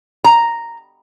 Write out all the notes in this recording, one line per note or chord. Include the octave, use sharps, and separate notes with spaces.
A#5